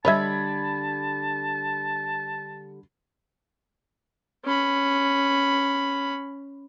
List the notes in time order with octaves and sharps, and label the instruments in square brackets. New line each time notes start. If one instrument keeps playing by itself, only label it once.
[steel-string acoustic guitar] D3 G3 [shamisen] C#5 D#5 E5 [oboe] A5 [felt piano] B5 G#6
[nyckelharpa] C#4 B5